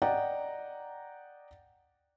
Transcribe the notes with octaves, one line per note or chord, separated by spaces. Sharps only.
D5 D#5 F#5 G5 A#5